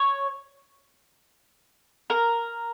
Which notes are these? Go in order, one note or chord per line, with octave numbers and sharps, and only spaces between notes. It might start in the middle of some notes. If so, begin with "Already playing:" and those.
Already playing: C#5
A#4